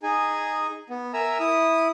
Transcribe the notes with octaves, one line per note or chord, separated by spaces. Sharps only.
D#4 G#4 G#5
B3
A#4 E5 G#5 A#5 E6
E4 D#6